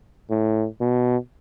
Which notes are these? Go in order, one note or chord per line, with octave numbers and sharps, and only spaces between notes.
A2
B2